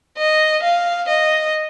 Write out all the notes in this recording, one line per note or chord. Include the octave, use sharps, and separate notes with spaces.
D#5
F5
D#5